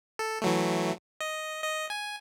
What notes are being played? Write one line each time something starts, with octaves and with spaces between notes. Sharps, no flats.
A4
E3 F#3 A3
D#5
D#5
G#5